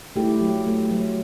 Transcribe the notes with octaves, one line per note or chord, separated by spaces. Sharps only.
A3 E4 G4
F#3
A3
F#3